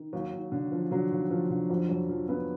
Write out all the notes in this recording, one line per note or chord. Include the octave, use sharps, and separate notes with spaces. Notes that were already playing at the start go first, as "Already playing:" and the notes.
Already playing: D#3
D#2 F#3
D#2
D3
F3
D3 F#3
D#2
F3
D3
F2 F#3
F2 F#3
F3
F3 B3